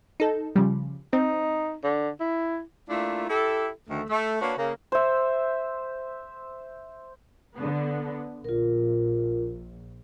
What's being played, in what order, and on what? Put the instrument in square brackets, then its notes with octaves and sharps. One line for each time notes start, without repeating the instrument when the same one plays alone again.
[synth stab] D#4 A4
C#3 F3 G3
[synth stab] C4 [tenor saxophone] D#4
[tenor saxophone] D3
E4
[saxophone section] A3 A#3 D4 E4 F4
E4 G4 A4
D2 D#3 A3
A3
A#3 D4 F#4 B4 C#5
C#3 A#3
[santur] C5 E5
[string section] D3 B3
[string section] A#1 [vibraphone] F4 A#4